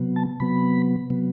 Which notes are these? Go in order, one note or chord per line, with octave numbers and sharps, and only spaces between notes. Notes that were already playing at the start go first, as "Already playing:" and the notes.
Already playing: C3 F#3 B3
A5
C3 F#3 B3 B5
C3 F#3 B3